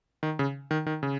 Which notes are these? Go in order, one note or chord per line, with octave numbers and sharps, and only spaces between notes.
D#3
C#3
D#3
D#3
C#3